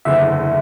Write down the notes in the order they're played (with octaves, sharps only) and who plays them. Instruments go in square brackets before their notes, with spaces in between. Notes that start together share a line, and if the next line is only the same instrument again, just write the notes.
[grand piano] F#1 E2 D3 [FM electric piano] E5